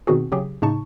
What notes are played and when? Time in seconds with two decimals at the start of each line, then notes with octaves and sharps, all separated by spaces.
0.07 B2 D#3 C4 F#4 G#4
0.32 C#3 F#3 G4 G#4
0.62 A2 C#3 D#4 A5 C#6